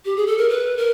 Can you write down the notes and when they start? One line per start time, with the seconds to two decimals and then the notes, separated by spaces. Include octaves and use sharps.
0.05 G4
0.16 G#4
0.27 A4
0.38 A#4
0.49 B4
0.77 A#4